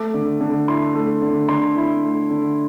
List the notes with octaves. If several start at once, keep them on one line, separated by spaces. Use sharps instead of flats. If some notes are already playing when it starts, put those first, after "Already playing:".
Already playing: A3 D6
D3
D3
E4 C6
A3
D3
D3 C6
E4
A3
D3